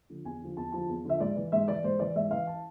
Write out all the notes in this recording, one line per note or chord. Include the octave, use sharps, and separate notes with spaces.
D3 F3
E2 G#5
D3 F3
E2 A5
D3 F3 A5
E2
D3 F3 E5
G#2 D5
E3
G#2 E5
E3 D5
G#2 C5
E3 D5
G#2 E5
E3 F5
A5